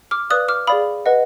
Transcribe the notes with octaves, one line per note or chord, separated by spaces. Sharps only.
D6 F6
B4 D5 F5 D#6 F#6
D6 F6
G#4 D5 F5 B5 D#6
B4 D#5 F#5